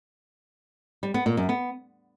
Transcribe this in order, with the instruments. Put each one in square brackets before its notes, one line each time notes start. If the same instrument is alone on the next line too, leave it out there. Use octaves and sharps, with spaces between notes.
[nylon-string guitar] G3
B3
A#2
F#2
B3